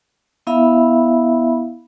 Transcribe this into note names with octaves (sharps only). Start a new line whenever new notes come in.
B3 E4 E5 F5 B5